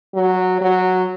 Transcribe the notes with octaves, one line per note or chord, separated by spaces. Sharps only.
F#3
F#3